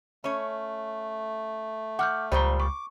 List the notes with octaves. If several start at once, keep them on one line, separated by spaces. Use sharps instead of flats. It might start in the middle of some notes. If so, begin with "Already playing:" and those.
A3 C#4 C#5
F#5 D6 F6 G6
C#2 A#2 F3 G3 C5 C#6 G7
C#6 D6